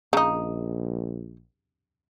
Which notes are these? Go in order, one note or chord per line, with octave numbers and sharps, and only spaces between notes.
A#1 C#3 D#4 A#5 D#6